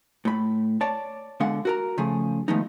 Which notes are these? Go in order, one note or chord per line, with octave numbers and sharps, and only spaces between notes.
A2 B5
C#5 D5 A5
B2 D3 G#3 F5 F#5
F#4 A#4 A#5
C#3 F3 A3 G#4
D#3 F3 G#3 A3 B3 D#4